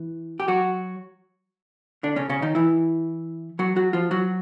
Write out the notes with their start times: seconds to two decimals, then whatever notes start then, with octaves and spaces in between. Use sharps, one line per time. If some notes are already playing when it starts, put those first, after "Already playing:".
Already playing: E3
0.40 G4
0.48 F#3 F#4
2.03 D3 D4
2.16 C#3 C#4
2.29 C#3 C#4
2.42 D#3 D#4
2.55 E3 E4
3.59 F#3 F#4
3.76 F#3 F#4
3.93 F3 F4
4.11 F#3 F#4